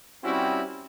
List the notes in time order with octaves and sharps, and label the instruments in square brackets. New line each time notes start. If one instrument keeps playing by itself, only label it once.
[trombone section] G3 C4 C#4 E4 F#4